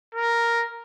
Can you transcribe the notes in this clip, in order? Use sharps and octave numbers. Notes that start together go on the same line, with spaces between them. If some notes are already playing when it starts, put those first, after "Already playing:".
A#4